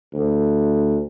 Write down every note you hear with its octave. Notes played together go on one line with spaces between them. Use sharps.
D2